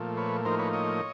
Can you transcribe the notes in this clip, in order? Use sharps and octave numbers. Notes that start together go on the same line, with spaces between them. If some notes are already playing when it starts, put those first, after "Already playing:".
Already playing: A#2 F3 A3
B4 C#5
A2 F3 A#3 D#4 A#4 C5
B4 C#5
C#5 D#5